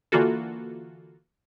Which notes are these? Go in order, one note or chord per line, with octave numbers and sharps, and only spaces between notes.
D3 E3 A#3 F4 F#4 A4